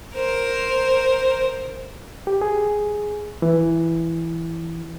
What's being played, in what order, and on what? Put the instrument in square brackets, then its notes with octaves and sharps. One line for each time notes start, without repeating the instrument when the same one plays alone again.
[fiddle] A#4 C5
[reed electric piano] G4
G#4
E3